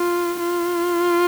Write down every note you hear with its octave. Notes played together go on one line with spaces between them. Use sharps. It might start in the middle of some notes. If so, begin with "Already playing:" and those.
Already playing: F4
F4